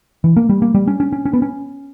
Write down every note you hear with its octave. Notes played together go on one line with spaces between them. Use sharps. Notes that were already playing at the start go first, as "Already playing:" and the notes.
E3
A#3
G3
A#3
G3
C#4
C#4
C#4
C#4
B3
C#4